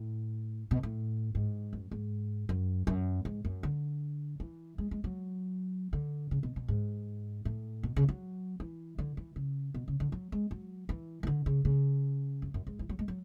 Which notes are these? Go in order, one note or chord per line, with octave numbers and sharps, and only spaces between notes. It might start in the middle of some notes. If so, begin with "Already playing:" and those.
Already playing: A2
B2
A2
G#2
F#2
G#2
F#2
F#2
G#2
F#2
D3
E3
G#3
G#3
F#3
D3
C#3
B2
B2
G#2
A2
B2
C#3
F#3
E3
D3
E3
C#3
B2
C#3
D3
F#3
G#3
F#3
E3
E3
D3
C#3
C#3
F#2
F#2
G#2
E3
F#3
G#3
F#3